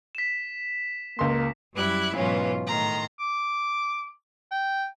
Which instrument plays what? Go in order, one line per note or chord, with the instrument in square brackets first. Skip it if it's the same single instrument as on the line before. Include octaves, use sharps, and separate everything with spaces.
[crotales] B6 E7
[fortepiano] C#2 C6 [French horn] A#3
[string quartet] F#2 G3 E4 D6 F#6 G#6
G#2 B2 E3 F#3 C#4 F4
A2 D#3 A#5 C6
[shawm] D6
G5